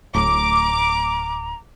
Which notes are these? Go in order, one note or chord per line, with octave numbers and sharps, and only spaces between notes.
D1 A2 A#5 D6